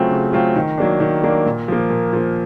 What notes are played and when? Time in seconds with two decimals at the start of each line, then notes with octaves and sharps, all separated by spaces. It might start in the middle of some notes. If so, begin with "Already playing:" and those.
Already playing: C#3 F#3 A3 C4 F4
0.11 C#3
0.33 F#3 A3 C4 F4
0.56 D#3
0.78 F#3 A#3 D4
1.00 D#3
1.24 F#3 A#3 D4
1.46 A#2
1.68 F3 A#3
1.90 A#2
2.13 F3 A#3